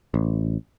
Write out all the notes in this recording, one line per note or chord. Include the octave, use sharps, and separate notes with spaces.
A1